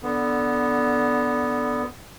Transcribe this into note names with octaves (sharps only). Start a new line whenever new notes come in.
D3 B3